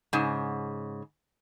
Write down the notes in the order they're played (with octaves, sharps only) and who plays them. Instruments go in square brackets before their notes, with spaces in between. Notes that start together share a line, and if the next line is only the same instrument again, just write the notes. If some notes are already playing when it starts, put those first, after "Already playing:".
[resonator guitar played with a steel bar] G#2 C#3